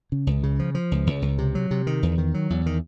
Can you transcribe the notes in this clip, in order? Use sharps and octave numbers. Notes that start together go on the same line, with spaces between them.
C#3
C#2
C#3
F3
F3
C#2
C#2
C#2
C3
F#3
C3
D#3
E2
D#3
F#3
E2
D#3